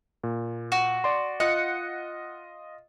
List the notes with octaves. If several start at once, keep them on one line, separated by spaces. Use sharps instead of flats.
A#2
F#4
D5 C6
F4 D#5 F#5